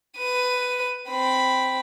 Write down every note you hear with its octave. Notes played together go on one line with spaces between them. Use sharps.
B4 D#7
C4 B5